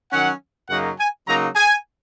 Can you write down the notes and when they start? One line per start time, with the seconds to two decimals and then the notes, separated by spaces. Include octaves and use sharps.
0.11 D#3 F#3 C#4 F#5
0.69 F#2 C#3 F#3 A#3 D#4 F#5
0.98 G#5
1.27 C#3 F#3 A#3 D#4 A#5
1.56 G#5